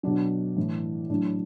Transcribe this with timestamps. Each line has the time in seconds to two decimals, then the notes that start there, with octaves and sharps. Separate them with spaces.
0.03 B2 F#3 D4
0.56 A2 E3
1.10 A2 F#3 D4